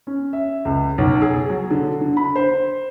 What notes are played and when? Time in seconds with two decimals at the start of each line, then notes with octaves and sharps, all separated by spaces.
0.07 C#4
0.33 E5
0.65 C#2
0.98 B1
1.22 G#4
1.50 F#3
1.70 D3
2.01 D3
2.17 B5
2.36 C5